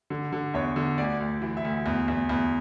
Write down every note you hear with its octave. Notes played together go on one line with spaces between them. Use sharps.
D3
D3
E2 C#5
D3
D2 D5
D2
E3
E5
D2
E2
E2
E2